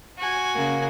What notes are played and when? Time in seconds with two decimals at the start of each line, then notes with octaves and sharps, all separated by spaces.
0.18 F#4 G#5
0.55 C#3 A#3